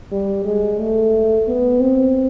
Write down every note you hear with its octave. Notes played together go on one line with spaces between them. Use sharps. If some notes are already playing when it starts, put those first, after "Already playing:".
G3
G#3
A3
B3
C4